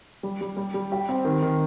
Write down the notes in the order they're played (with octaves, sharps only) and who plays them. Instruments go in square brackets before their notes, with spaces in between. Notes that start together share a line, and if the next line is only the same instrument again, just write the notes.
[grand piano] G3
G3
G3
G3
G4
C4
D#3
D#3